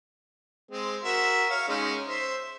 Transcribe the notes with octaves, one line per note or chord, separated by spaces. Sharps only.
G#3 C4
F#4 A#4 E5
C#5 F5
G#3 C#4 D#4
C5 E5